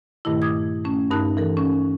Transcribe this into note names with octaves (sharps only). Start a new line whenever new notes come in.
G2 A#2 D#3 A3 E4
D6 D#6 G#6
A3 C#4
G2 D#4 A#4 A5 F#6
E3 A4 A#4
C#4